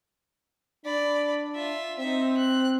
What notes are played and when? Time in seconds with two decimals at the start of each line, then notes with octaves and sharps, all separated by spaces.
0.85 D4 D5 B5
1.55 F4 E5
1.99 C4 D#4 E5
2.38 F#6